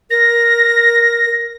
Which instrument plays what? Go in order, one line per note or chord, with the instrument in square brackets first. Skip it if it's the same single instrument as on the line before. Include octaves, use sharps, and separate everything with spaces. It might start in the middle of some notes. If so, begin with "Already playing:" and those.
[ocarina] A#4 [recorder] A#6